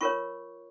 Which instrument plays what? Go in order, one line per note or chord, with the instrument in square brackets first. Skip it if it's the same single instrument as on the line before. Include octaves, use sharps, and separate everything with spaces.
[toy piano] F4 A#4 C#5 C#6